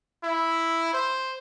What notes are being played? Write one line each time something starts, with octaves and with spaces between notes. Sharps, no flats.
E4
C5